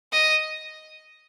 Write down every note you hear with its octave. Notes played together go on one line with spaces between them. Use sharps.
D#5